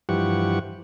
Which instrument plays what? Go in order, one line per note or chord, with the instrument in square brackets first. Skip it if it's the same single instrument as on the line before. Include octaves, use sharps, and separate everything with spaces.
[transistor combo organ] G2 E3 F3 G4 F#5 C#6